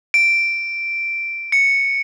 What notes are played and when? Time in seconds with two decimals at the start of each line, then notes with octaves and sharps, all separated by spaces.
0.14 D7
1.52 C#7